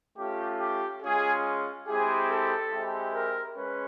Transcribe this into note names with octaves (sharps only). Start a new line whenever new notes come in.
A3 C#4 F4 G4
G4
G#3 C#4 F4 G#4
G#3 C4 E4 G4 G#4
A4
G#3 C4 E4 G4
A#4
G#3 C#4 B4